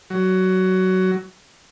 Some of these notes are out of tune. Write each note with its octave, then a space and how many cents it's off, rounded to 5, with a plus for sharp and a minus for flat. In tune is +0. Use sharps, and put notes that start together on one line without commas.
F#3 +15